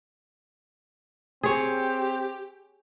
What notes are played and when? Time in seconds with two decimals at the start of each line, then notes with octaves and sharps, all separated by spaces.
1.43 C4 G4 G#4 C#5